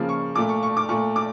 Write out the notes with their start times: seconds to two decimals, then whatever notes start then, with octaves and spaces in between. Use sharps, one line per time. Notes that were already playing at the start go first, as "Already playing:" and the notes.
Already playing: C#3 F3 A#3
0.09 C#6
0.35 A#2 A3 D6
0.49 C#6
0.63 C#6
0.77 D6
0.89 A#2 A3 C#6
1.16 D6